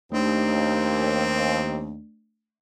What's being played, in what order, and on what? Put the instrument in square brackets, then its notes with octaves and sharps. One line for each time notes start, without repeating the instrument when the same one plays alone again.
[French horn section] D#2 [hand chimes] A3 D4 [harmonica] C4